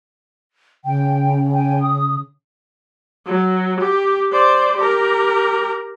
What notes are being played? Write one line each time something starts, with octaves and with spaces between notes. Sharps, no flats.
C#3 G5
G5 G#5
D#6
F#3
G4
C5 D5
G4 A#4